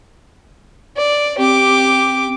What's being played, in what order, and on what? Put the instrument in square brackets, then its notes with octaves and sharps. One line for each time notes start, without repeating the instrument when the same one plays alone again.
[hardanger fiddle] D5
[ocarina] C4 [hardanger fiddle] G4 D6